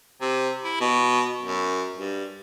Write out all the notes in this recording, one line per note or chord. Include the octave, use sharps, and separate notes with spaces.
C3
E4
B2
F#2
G2